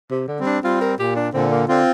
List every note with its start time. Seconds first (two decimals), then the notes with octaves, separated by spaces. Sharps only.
0.11 C3
0.28 D3
0.40 G3 C4
0.46 D4
0.63 G3 C4 F4
0.81 A#4
0.98 A#2 G4
1.16 D4
1.34 A#2 D3 C4
1.51 A#3
1.68 D3 C4 F4